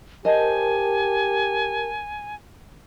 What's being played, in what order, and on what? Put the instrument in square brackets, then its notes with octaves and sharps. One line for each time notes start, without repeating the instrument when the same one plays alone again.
[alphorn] G4 [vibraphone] A#4 A5 [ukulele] C5 D#5 [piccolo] G#5